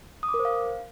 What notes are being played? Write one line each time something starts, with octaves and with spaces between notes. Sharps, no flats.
D#6
D6
A#4
C5
F5